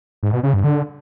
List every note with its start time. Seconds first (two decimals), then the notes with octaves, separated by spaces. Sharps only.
0.23 G#2
0.33 B2
0.43 C#3
0.54 G2
0.64 D3